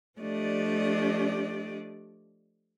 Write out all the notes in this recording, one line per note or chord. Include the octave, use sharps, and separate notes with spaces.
F3 A3 D4 G4 D5 D#5